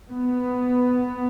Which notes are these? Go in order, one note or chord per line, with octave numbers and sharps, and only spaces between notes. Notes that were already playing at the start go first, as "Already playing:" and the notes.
B3